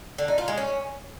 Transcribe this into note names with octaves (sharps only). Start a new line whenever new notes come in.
D3
D#4
F4
G#3
C#4